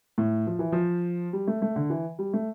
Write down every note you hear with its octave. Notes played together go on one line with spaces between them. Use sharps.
A2
F3
E3
F3
G3
A3
A3
D3
E3
G3
A3